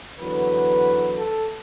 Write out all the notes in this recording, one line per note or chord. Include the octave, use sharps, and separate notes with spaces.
E2 D3 F#3 B4
A4